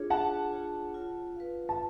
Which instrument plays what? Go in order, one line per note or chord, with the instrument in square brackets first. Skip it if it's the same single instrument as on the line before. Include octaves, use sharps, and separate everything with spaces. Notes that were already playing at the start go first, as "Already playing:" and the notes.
Already playing: [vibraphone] D4 F4 G#4 C#5
[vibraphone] D4 [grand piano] F#5 A5
[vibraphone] F4 G#4 C#5
F4
B4 F5
[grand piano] A5